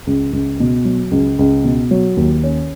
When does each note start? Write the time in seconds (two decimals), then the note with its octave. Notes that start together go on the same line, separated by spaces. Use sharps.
0.07 C#2
0.33 C#2
0.60 B2
0.85 F#3
1.11 C#2
1.39 C#2
1.64 B2
1.91 F#3
2.17 D#2
2.44 C#4